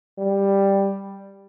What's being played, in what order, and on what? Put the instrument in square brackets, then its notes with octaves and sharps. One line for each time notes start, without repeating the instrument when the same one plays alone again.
[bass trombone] G3